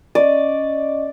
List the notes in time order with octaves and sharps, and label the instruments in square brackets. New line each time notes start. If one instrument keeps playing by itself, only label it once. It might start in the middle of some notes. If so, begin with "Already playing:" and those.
[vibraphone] C#4 D#5 [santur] D5